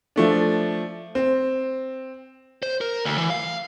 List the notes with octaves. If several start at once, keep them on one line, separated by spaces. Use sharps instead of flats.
F3 A3 D4
C4
C5
A#4
D2
E3
F5